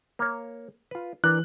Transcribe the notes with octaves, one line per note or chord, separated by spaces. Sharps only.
A#3 C#5
F4 B4
E3 D4 A#4 F#6